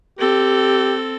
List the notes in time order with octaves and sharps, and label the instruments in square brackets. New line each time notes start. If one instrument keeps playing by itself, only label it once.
[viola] C4 A4 [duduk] G4